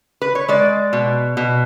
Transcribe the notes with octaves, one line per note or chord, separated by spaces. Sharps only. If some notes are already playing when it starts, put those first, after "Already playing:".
B4
C#5
G#3 D5
B2
B2